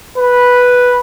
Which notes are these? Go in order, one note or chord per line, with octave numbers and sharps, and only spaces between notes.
B4